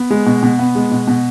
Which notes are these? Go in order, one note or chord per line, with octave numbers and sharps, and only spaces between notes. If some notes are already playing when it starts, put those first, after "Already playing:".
Already playing: B3
G#3
B2
B2
B3
G#3
B2
B2